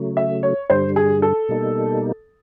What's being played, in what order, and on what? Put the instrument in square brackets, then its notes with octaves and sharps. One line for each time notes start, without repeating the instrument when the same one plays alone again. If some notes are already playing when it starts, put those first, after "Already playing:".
Already playing: [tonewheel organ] C#3 F#3 A3
[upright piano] E5
C#5
[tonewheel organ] G2 D3 G3 [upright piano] C5
[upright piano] G#4
A4
[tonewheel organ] B2 G3 A#3 D#4